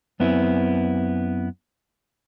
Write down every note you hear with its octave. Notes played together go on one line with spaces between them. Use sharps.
F#2 B3 C4 E4